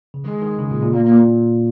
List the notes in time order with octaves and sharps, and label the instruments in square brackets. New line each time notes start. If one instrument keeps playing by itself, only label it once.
[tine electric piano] C#3
[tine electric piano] D#3 [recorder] G#3
[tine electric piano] D#3
C#3
A#2
A#2
[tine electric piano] A#2 [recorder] A#3
[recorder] A#3
[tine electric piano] A#2